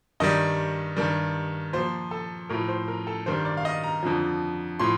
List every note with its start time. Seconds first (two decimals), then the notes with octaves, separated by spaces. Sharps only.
0.20 G2 D#3 G3 D#5
0.96 G2 D#3 G3
1.73 A#2 F3 C5
2.11 A4
2.49 A2 F3 A#4
2.68 C5
2.88 A#4
3.07 A4
3.26 G2 D#3 G3 C5
3.45 D5
3.57 F5
3.65 D#5
3.84 A#5
4.03 F2 D3 F3
4.80 A2 F3 C6